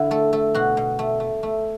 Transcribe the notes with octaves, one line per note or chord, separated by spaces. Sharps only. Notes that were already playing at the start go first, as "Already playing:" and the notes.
Already playing: D3 E4
A3 A4
A3 A4
B2 F#4
B2
A3
A3
A3